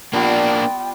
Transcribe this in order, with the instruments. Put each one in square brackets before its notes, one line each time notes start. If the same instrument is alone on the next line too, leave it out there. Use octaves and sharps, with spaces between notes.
[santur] G3 B3 F4 [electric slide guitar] A#3 D4 [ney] G5